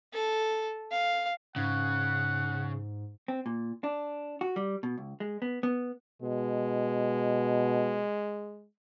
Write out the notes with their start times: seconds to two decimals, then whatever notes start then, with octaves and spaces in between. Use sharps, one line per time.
0.13 A4
0.92 F5
1.56 G#2 C#3 F#5
3.28 C4
3.46 A#2
3.84 D4
4.41 F#4
4.56 G3
4.83 B2
4.98 C#2
5.20 G#3
5.42 B3
5.63 B3
6.22 B2 G#3